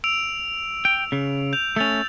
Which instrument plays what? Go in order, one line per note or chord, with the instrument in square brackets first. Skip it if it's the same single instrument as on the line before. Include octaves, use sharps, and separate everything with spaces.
[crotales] E6 D7 F7
[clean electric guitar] G5
C#3
[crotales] G6 F7
[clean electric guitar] A3 C#4 [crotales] E6 A6 F7